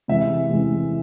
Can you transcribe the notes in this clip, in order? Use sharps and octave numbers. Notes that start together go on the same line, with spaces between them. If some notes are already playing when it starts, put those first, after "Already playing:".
C3 E3 G#3 E5
C3 E3 G#3